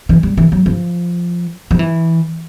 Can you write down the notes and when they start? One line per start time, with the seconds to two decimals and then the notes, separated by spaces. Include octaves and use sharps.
0.09 E3
0.23 G3
0.37 E3
0.52 F#3
0.66 F3
1.71 F3
1.79 E3